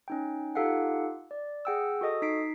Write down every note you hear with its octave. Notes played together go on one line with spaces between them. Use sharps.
C#4 D#4 G5
D#4 F4 G4 A4 F5 F#5
D5
G#4 F#5 G5 D#6 E6
F#4 A4 D#5 D#6
D#4 B6 C7 D7